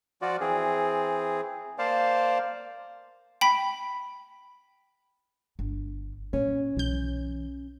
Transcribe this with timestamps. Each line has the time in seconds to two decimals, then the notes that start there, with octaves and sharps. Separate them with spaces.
0.22 F3 F4 F#4 D5
0.41 E3 C4 G#4
1.78 A#3 C5 D5 F5 A5
3.41 G5 B5 B6
5.59 G1
6.33 A#2 C#4
6.77 B1 E3 G6